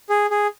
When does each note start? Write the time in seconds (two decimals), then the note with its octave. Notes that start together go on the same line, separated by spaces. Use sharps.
0.10 G#4
0.31 G#4